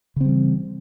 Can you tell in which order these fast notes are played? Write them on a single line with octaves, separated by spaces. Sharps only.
C#3 C4 G3 E3